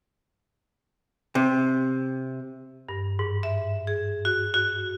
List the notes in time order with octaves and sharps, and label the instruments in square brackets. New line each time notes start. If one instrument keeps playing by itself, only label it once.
[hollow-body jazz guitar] C3
[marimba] G2
G#2
E5
G#4
F#4
F#4